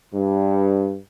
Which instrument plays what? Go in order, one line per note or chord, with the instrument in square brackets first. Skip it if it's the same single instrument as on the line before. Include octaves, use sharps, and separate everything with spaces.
[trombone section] G2